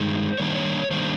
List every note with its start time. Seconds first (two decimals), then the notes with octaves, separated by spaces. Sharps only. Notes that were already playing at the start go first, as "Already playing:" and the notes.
Already playing: G2 D#3 G#3 C5
0.38 D#3 G3 A#3 D4 C#5
0.48 C5
0.55 C#5
0.91 D#3 G3 A#3 D4 C5